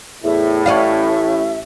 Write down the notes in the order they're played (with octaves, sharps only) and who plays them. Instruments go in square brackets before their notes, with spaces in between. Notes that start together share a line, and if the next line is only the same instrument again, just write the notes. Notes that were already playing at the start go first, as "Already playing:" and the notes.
[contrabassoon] E2 [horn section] A2 [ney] E5
[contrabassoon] A1 [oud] C#4 D5 F5 [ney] E5